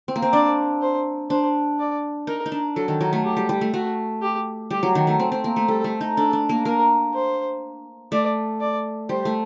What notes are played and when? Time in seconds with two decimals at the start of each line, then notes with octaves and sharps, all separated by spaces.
0.08 C4
0.16 A#3
0.22 C4
0.32 D4 D5
0.81 C5
1.30 D4 C5
1.79 D5
2.27 D#4 A#4
2.46 D#4
2.52 D4
2.76 F#3 A4
2.88 D#3
3.01 F#3
3.13 A3
3.25 G4
3.37 G3
3.49 G3
3.61 A3
3.73 A3 F#4
4.22 G4
4.70 G3 G4
4.83 F#3
4.95 D#3
5.07 A3
5.20 C4
5.32 C4
5.44 A#3
5.56 A3
5.68 G3 A4
5.84 A3
6.01 D#4
6.17 D4 A4
6.33 D4
6.49 A#3
6.65 A#3 A#4
7.14 C5
8.12 A3 D5
8.60 D5
9.09 G3 C5
9.25 A3